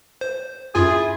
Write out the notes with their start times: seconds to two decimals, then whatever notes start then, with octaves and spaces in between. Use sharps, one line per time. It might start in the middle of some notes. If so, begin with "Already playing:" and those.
0.21 C5
0.75 F#2 E4 F4 G#4 G#5